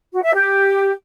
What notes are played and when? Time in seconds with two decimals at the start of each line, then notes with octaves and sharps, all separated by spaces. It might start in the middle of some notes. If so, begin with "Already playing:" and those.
0.13 F#4
0.23 E5
0.34 G4